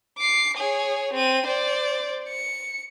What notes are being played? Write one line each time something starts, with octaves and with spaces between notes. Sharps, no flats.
D6 C7
G#4 C#5
C4 D#7
C5 D5
C#7